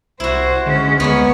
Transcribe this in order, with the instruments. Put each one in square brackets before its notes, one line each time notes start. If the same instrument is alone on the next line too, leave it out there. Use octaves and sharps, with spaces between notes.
[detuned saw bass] C2 [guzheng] E4 F#4 [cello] C5
[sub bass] D3 [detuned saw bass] G#3 [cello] C#4
[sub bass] D2 [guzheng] A#3 B3 [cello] C#5